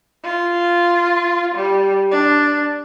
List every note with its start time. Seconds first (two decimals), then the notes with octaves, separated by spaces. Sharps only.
0.24 F4
1.55 G3
2.11 D4